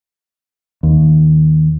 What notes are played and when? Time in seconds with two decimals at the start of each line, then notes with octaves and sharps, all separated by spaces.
0.83 D#2